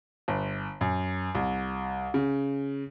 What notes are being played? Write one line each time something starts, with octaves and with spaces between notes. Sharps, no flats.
G1
F#2
C2
C#3